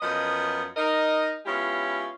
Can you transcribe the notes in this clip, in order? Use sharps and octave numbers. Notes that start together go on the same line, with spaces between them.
F#2 F3 B3 D#5
D#4 A#4 D#5
G#3 B3 C#4 E4 F4 G4